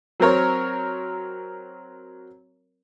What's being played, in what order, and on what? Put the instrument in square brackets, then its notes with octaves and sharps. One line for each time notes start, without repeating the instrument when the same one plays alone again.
[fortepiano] F#3 C4 A#4 C#5